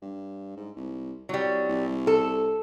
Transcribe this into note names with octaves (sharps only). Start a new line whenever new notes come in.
G2
G#2
C2
C2 F#3 G3
C2
A4